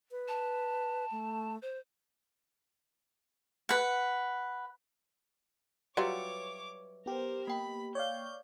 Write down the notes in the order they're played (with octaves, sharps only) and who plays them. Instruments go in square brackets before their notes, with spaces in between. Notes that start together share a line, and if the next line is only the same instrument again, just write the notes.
[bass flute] B4
[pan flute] A5
[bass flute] A3
[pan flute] C5
[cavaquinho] B4 F#5
[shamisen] F#3 G3 F4 [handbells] B4 E5 C#7 [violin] C#5 D6
[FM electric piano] B3 G4 [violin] A#4 C5
[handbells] A#3 G5 [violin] B5
[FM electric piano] C#5 D5 F5 [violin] G6